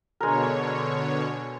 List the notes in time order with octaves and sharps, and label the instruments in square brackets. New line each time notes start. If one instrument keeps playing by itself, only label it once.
[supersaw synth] B2 D3 C#5 [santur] G#3 A#4